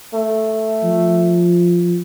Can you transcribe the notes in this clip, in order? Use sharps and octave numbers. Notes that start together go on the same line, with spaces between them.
A3
F3